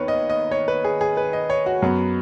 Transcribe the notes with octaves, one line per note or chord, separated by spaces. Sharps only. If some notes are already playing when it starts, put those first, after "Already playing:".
Already playing: D#2 D#3 B3 B4 C#5
D#5
D#5
C#5
B4
G#4
G#4
B4
D#5
C#5
F#4
F#2 F#3 B3